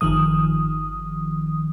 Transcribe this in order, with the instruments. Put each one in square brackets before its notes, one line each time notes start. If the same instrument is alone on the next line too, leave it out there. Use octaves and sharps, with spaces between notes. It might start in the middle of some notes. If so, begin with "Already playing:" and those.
[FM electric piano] G1 D#3 F3 D#6